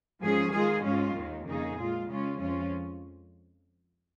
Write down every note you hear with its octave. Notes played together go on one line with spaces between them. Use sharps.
G#2 F3 C#4 G#4
D#3 G#3 F4 G#4
G#2 G#3 C#4 F4
D#2 D#3 G#3
F2 C#3 A#3 D#4 G#4
A#2 G#3 F4
C#3 G#3 C#4 F4
F2 F3 G#3 C#4 F4